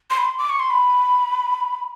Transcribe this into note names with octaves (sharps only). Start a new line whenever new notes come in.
C6
B5
C6
D6
C#6
C6
B5